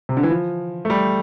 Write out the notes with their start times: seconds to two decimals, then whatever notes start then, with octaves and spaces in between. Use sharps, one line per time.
0.09 C3
0.17 D3
0.23 E3
0.30 F3
0.85 A3
0.90 G3